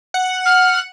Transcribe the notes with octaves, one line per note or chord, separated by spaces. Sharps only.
F#5
F6